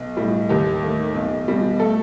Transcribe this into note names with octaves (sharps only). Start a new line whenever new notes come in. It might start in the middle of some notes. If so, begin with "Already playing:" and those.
Already playing: B1
A2 G3
D#2 G4
D#3 A3
B1
B2 G3
A3 A4